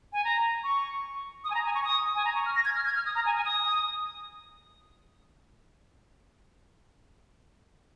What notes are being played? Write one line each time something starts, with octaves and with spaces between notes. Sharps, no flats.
G#5
A#5
C#6
D#6
G#5
A#5
G#5
C#6
D#6
G#5
A#5
C#6
F6
A#6
G#6
F6
G#6
F6
D#6
A#5
G#5
G#5
D#6